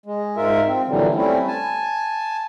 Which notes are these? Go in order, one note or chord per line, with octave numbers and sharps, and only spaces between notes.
G#3
G#2 F4 A#4 E5
C4
A#2 D3 E3 F#3 G3
G3 A3 C4 C#4 E4
G#5 A5